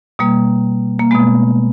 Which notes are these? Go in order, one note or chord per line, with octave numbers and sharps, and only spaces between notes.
B2 G3 A#3
A#3
B2 G#3 B3